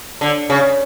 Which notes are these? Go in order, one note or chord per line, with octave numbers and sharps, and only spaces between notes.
D3
C#3